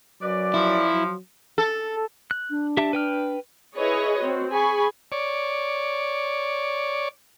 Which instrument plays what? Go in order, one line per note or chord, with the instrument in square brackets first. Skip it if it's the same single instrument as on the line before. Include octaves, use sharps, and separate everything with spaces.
[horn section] F#2 B4 D5 [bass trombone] F#3
[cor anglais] F3 [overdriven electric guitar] E4
[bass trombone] F#3
[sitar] A4
[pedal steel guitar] F#6
[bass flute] D4
[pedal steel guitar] G4 E5 A5
B4 G5 F6
[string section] E4 G#4 B4 C#5 D#5
C4 F#4
G#4 G#5 B5 C#6
[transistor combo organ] C#5 D5